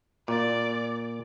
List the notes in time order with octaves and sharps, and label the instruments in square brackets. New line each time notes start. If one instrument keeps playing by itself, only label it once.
[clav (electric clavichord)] A#2 [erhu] D5